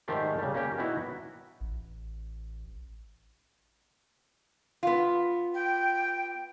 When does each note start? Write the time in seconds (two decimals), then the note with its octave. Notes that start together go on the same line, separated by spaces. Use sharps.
0.08 G#2 D#3 A3 G4 C5 D5
0.39 C#3 G3
0.54 A#3 C#4 G4
0.78 B3 D#4 E4 F#4
1.60 A1
4.83 B3 F4
5.54 G5